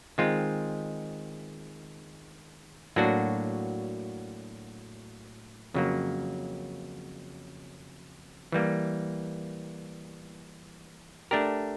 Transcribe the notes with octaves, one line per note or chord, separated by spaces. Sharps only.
D#3 G#3 C4 F4
A2 F#3 A#3 D4 F#4
F2 C#3 F#3 A#3
E3 G3 A#3
A3 D4 G4 A#4